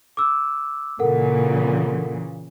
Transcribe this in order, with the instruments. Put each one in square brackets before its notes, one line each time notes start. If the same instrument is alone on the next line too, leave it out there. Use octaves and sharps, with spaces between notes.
[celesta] D6 E6
[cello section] A#2 C#3 E3 [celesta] A4 A#4 F#5